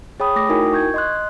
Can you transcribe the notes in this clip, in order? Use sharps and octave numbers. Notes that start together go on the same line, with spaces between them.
G#4 C#5 G5 B5 D#6
A3 D6 D#6 A#6
D#4 E4 F#4 A#4 G5 G#5
C#6 G6 G#6
D#5 C6 F#6